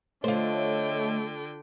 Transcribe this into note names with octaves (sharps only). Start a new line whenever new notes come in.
D3 A3 F4 C5 C#5 D#5 G5